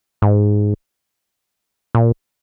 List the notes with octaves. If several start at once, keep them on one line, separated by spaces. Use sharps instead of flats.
G#2
A#2